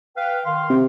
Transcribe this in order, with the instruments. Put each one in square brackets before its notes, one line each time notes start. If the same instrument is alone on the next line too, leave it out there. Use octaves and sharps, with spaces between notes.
[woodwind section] B4 F5 G5
D#3 F5 C6
[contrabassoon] C3